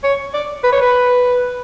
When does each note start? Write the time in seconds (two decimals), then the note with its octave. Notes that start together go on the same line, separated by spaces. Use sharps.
0.03 C#5
0.34 D5
0.64 B4
0.72 C#5
0.82 B4